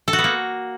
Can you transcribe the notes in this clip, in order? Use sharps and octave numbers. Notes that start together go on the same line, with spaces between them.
A4
F#4
B3
A#3